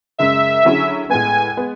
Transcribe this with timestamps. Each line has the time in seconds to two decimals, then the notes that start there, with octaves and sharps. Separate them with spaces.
0.19 F#2 C#3 G#3 E5
0.65 D3 F#3 C#4 E4 G#4
1.10 A2 G#3 B3 G#5
1.57 G#3 B3